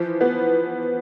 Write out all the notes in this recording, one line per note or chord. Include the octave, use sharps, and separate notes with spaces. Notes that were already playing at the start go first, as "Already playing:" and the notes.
Already playing: E3 F3
B3